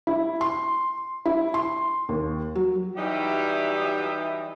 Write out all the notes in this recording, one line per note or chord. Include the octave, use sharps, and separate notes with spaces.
E4
C6
E4
C6
D#2
F#3
E3 F#3 G3 D#4 G4 E5